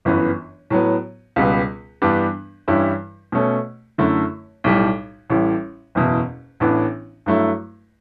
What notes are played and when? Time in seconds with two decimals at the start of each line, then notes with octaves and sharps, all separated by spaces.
0.05 G1 F#2 E3 B3
0.70 A2 F#3 B3
1.36 C#2 B2 G3 B3
2.02 G2 E3 G3 B3 D4
2.68 G2 E3 G3 C#4 E4
3.32 B2 A3 C#4
3.98 F#2 D3 A3 E4
4.64 B1 A2 G3
5.30 A1 A2 G3
5.95 F#1 E2 B2
6.60 A1 A2 E3 B3 D4
7.26 G2 F#3 A3 E4